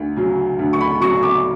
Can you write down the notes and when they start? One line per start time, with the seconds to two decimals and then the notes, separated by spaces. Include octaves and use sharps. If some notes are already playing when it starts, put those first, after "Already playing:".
Already playing: D2
0.16 C#3 F#3
0.59 D2
0.73 C#6
0.81 B5
1.00 C#3 F#3 C#6
1.23 D6